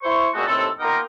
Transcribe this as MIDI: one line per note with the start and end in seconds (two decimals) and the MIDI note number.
0.02 0.28 64
0.02 0.28 72
0.02 0.28 85
0.34 0.43 46
0.34 0.43 56
0.34 0.43 57
0.34 0.43 59
0.34 0.43 60
0.34 0.43 66
0.46 0.66 39
0.46 0.66 45
0.46 0.66 48
0.46 0.66 60
0.46 0.66 69
0.80 0.99 58
0.80 0.99 59
0.80 0.99 63
0.80 0.99 65
0.80 0.99 67
0.80 0.99 70